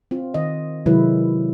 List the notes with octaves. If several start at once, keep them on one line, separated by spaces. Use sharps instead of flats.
C4 F4
D#3 D#5
C3 D#3 F#3 G#3 E4 B4